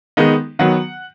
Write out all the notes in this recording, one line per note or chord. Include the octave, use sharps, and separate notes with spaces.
D#3 G#3 B3 D#4
D#3 F#3 B3 F#5